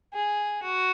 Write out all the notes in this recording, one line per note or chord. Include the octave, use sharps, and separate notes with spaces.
G#4
F#4